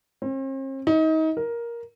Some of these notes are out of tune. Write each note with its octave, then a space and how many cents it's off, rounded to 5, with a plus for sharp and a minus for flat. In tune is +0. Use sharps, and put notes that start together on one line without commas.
C4 +45
D#4 +30
A#4 +10